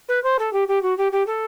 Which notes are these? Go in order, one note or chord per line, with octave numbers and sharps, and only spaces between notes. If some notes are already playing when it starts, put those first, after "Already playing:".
B4
C5
A4
G4
G4
F#4
G4
G4
A4